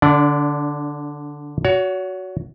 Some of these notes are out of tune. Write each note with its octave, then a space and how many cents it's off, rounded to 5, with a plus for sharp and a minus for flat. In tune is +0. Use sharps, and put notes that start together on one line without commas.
D3 +0 D4 -30 D5 +0
F#4 +0 C#5 +35